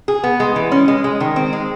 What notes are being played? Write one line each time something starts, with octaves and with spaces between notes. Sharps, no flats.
G#4
B3
G#3
E3
C#4
G#3
G#3
D#3
C4
G#3